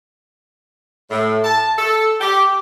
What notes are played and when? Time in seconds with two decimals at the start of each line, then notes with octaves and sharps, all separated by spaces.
1.11 A2
1.44 A5
1.78 A4
2.20 G4